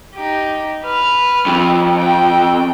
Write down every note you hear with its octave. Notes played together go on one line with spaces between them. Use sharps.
D#4 G4
B4 F6
F2
G5